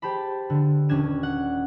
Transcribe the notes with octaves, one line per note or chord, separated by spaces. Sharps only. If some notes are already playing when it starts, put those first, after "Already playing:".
G4 C5 A5 B5
D3
D#1 C#4 D4 G#6 E7
F#5